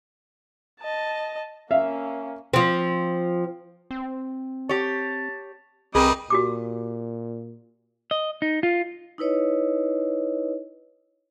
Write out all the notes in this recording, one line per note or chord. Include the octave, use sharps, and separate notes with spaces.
D#5 A5
A#3 C#4 E5 F5
F3 C4
C4
G4 C#5 A5
C2 G3 C4 G#4 A#4 B4 D#5
A#2 F#4 G4 D6
D#5
D#4
F4
D#4 E4 B4 C#5 D#5